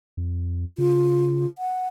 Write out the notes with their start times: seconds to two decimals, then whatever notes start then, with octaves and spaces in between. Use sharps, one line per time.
0.17 F2
0.78 C#3 F4
1.58 F#5